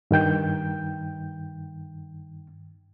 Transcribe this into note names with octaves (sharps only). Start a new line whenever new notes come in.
G2 D#3 G5 G6